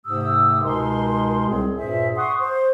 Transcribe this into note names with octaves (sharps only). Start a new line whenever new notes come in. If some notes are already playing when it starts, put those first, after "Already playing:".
G#2 C3 A3 G4 D#6 E6
C#2 B2 G#3 D#4 A#4 C6
C2 A2 C4 G#4
G2 A#2 G#4 C5 E5
F#5 C6 C#6 D#6
C5